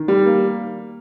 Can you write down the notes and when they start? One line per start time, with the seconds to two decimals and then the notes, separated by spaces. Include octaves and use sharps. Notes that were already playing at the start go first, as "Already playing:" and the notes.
Already playing: D#3
0.08 G3
0.26 A#3